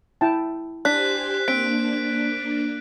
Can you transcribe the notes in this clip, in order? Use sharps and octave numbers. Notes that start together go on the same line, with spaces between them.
E4 G5 A5
D4 G4 C5 G#5 F#6 B6
A#3 C4 D4 B6 D7